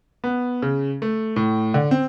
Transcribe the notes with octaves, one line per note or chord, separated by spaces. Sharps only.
B3
C#3
A3
A2
D3
C4